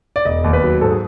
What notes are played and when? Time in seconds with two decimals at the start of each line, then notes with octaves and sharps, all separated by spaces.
0.16 D5
0.25 E1 D#5
0.44 D#2
0.53 B4
0.64 F#3
0.81 G#2 A4
0.90 G#4